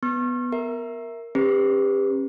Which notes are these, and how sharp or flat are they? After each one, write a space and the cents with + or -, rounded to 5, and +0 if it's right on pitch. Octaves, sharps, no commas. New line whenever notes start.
B3 +0 C#6 -40
A#4 +0 E5 +0
C#4 -40 G4 +30 B4 +0